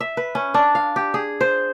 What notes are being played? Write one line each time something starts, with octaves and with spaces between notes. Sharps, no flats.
E5
B4
C#4
D4
F5
G4
G#4
C5